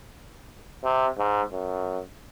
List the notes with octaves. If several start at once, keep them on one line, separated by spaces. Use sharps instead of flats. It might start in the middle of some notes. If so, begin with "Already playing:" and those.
C3
G#2
F#2